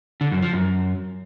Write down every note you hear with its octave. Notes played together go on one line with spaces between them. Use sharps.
D3
F#2
F3
F#2